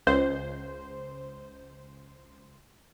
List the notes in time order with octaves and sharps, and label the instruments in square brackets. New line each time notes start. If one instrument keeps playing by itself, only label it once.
[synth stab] C#2 C5